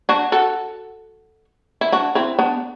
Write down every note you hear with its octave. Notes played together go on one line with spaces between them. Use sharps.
D4 F#4
F#4 A4
E4
D4 F#4
C4 E4
B3 D4